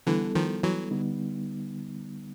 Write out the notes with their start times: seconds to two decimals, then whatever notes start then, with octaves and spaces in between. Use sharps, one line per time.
0.07 D3 E3 G3 B3 E4 A4
0.35 D#3 F3
0.63 E3 F#3
0.91 D3 G3 B3 D#4